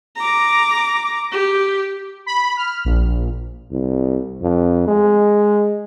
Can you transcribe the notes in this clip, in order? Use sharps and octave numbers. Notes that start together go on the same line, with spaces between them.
A#5 D6
G4
B5
F6
A#1
C2
F2
G#3